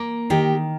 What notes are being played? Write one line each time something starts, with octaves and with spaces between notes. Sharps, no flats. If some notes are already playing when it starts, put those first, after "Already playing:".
Already playing: A#3
D#3 G4